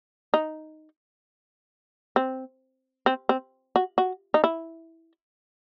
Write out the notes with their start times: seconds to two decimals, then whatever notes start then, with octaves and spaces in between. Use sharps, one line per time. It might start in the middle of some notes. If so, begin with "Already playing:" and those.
0.34 D#4
2.16 C4
3.06 C4
3.29 C4
3.76 F#4
3.98 F#4
4.34 D#4
4.44 E4